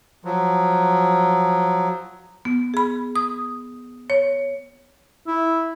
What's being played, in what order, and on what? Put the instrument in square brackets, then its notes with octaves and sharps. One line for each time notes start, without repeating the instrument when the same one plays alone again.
[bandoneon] F3 F#3
[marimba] B3
G#4 B5
D#6
C#5
[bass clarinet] E4